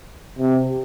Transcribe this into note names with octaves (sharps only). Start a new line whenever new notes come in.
C3